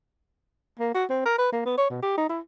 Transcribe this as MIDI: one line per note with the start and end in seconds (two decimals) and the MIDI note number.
0.79 0.93 58
0.94 1.04 66
1.10 1.25 60
1.25 1.34 70
1.38 1.50 71
1.52 1.62 58
1.66 1.76 59
1.78 1.86 73
1.90 2.00 47
2.02 2.16 67
2.17 2.27 63
2.29 2.40 64